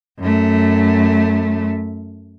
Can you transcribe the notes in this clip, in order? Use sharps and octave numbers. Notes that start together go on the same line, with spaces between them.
F#2 A3